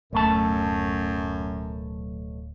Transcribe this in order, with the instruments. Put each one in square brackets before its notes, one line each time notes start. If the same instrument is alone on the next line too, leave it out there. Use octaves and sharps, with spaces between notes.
[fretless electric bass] D1 [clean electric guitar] B1 A3 A5 [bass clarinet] F#2